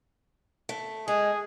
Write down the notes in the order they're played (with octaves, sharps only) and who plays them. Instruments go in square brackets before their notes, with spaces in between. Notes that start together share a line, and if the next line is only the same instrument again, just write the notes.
[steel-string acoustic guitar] A3
[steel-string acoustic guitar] G#3 [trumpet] G#4